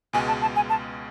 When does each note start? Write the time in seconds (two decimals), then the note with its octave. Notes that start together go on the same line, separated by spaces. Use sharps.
0.13 C#2 B2 G#3 G#5
0.28 A5
0.42 A5
0.56 G#5
0.70 A5